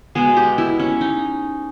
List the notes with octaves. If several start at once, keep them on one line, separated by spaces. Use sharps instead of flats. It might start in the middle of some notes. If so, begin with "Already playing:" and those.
B2 G#3 B3 G#4
G4
E4
C#4
D#4